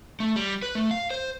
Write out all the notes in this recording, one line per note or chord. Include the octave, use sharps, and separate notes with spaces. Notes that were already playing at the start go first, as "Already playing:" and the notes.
A3
G3
B4
A3
F5
C5